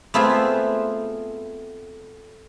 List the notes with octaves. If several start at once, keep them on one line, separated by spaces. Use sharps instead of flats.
A3 B3 C4 F4 G#4 E5